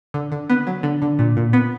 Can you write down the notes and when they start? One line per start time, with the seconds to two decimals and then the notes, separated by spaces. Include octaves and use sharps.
0.14 D3
0.32 D3
0.50 B3
0.67 F#3
0.83 D3
1.02 D3
1.19 A#2
1.37 A#2
1.53 B3